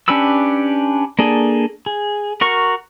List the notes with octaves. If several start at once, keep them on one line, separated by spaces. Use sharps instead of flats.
C#4 D4 G4 B4 E6
A#3 D4 G#4 A4
G#4
F#4 A#4 C#6